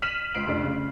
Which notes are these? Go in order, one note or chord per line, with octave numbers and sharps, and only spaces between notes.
F6 B6 D#7 E7 F#7
C#2 C7 D7 F#7
F1 D4
C#3